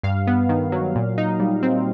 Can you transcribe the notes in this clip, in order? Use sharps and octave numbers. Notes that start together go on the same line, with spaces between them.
G2 F5
B3
D#3
F#3
A#2
D#4
G3
C4